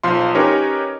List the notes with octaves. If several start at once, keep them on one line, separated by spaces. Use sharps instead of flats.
B1 F3 F5 C6
C#4 D#4 G4 A#4 B4 C#5